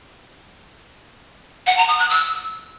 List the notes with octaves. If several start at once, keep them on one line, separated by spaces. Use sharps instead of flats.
F#5
A#5
D#6
F#6
E6